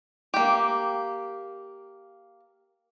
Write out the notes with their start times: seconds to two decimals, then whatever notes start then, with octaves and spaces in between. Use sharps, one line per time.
0.34 A#3 G4